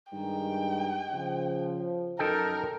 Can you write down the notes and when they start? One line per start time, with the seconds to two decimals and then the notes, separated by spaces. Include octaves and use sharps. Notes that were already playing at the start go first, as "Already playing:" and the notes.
0.13 G2 D#3 G#3 D#4 G5
1.13 C#3 F3
2.19 F#2 D#4 A4 A#4 G5